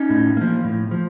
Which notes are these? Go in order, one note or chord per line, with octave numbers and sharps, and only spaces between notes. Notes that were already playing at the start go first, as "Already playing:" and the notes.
Already playing: C#4 D#4
A2
F3 A#3
A2
F3